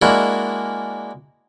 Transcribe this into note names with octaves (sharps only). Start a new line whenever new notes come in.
G#3 A#3 D4 E4 F#4